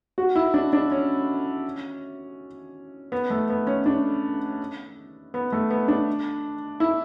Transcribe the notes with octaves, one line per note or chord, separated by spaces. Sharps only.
F#4
E4
D4
D4
C#4
B3
A3
B3
C#4
D4
B3
A3
B3
D4
E4